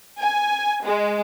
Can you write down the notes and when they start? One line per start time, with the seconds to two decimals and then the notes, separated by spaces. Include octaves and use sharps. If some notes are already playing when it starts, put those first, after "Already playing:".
0.21 G#5
0.85 G#3